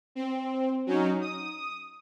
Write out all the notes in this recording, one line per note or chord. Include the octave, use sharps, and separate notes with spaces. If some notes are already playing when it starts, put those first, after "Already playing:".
C4
F#3 C#4 D#4
D#6